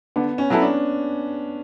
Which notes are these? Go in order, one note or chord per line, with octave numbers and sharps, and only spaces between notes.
D3 B3
C#4
F#3 B3 E4 A4
D4